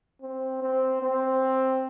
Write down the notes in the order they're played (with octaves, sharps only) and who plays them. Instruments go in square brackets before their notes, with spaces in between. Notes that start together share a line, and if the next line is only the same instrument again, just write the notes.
[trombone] C4
C4
C4